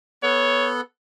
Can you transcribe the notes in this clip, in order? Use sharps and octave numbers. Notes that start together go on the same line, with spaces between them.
B3 A4 C#5 F#5